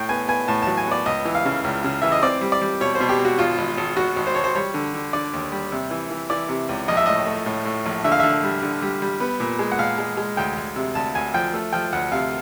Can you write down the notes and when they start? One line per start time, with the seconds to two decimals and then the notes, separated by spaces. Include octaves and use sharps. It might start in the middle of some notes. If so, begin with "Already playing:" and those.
Already playing: A2 G5
0.09 B3 G#5
0.28 B3 G#5
0.48 A2 A5
0.62 F#3 A5
0.77 G#5
0.87 B3 D5
1.06 C#2 D#5
1.25 E3
1.35 F5
1.45 C#3
1.64 C#2
1.84 C#3
2.02 E3 E5
2.12 D#5
2.23 C4 D5
2.41 G3
2.52 D5
2.62 G3
2.81 B2 C#5
2.95 C5
3.00 B2
3.09 G4
3.19 B2
3.25 F#4
3.38 G#1 F4
3.58 G#1
3.77 G#1
3.96 G#1 F#4
4.16 G#1
4.27 C5
4.35 G#1 C#5
4.44 C5
4.55 G3 C#5
4.74 D3
4.94 D3
5.13 D3 D5
5.33 D#2
5.52 G3
5.72 C3
5.91 E3
6.10 E3
6.30 E3 D5
6.49 C3
6.69 C#2
6.88 A#1 D#5
6.97 E5
7.06 A2 D#5
7.26 A3
7.46 A2
7.65 A2
7.86 A#1
8.04 D3 E5
8.12 F5
8.20 D3 E5
8.43 G3
8.63 D3
8.82 G3
9.02 G3
9.20 B3
9.40 A#2
9.59 G#3
9.72 F#5
9.79 A#2 F5
9.98 G#3
10.17 G#3
10.37 D2 G5
10.57 D2
10.76 C3
10.95 D2 A5
11.15 D2 G#5
11.34 F3 G5
11.54 A3
11.72 F3 G5
11.93 D2 F#5
12.12 C3 F5